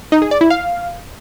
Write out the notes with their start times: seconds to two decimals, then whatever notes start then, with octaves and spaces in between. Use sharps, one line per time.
0.12 D#4
0.22 G#4
0.31 D5
0.41 E4
0.50 F5